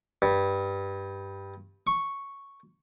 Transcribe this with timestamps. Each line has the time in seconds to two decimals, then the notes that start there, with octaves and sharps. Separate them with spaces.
0.22 G2
1.87 C#6